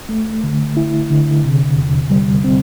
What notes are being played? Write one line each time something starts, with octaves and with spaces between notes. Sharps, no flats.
A3
D3
E4
D3
C3
E2
G3
C4